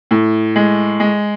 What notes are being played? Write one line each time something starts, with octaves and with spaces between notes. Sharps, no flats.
A2
G#3
G#3